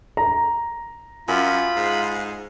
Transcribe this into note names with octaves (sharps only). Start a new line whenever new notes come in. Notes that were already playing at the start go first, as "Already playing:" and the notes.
A#5
F#2 F4 B5
G#2